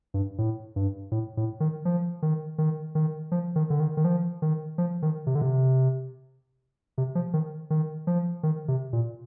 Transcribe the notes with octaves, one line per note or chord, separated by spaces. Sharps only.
G2
A2
G2
A2
A2
D#3
F3
D#3
D#3
D#3
F3
D#3
D3
D#3
D#3
F3
D#3
F3
D#3
C3
D3
C3
C3
F3
D#3
D#3
F3
D#3
C3
A#2